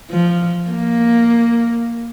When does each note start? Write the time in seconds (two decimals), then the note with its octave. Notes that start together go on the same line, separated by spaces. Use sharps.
0.11 F3
0.70 A#3